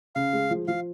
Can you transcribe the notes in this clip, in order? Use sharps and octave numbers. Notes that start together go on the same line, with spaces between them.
C#3 F5
G#3
F3
F3 F5